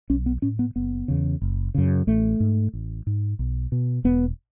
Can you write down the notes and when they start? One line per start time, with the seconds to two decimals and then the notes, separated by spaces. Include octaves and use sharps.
0.10 B1 C#4
0.26 B3
0.42 A2 C#4
0.59 B3
0.76 F#1 B3
1.08 E2 C#3
1.42 F#1
1.74 F#2 C#3
2.07 A1 A3
2.40 G#2
2.73 A1
3.07 G#2
3.39 B1
3.72 B2
4.04 E1 B3